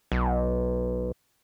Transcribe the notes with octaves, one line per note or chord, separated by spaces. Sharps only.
B1